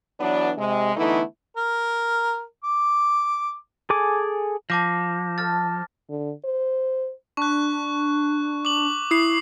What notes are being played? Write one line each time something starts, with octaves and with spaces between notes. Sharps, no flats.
E3 F#3 B3 D4
C3 G#3
D3 E3 A3 B3 D#4 E4
A#4
D6
G#4 A4 G#5 D6
F3 A5 D6 A#6
A4 C5 A5 F6 A6
D3
C5
D4 C#6 F#6
D6 F#7
E4 D#6 C7